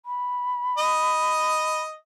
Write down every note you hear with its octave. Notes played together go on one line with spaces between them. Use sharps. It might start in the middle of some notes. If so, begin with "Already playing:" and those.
B5
D#5